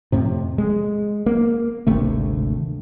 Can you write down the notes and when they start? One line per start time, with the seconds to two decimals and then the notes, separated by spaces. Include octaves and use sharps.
0.12 F2 A2 C3
0.58 G#3
1.26 A#3
1.87 G#1 D2 C3 A3